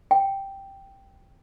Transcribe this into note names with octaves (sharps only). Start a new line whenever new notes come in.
G5